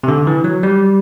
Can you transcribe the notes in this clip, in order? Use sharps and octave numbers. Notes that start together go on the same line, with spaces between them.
C3
D3
E3
F#3
G3